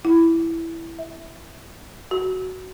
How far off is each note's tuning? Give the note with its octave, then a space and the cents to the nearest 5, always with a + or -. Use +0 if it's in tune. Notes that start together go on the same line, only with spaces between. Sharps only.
E4 +5
E5 -5
F#4 +10